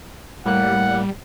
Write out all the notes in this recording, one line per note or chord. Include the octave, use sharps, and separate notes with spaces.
A2 G3 A#3 F#5 F#6